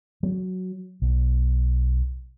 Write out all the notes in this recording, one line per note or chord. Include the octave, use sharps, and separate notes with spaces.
F#3
B1